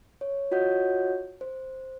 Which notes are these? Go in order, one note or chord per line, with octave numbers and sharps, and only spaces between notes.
C#5
F4 F#4 C#5 D#5 F#5 G6
C5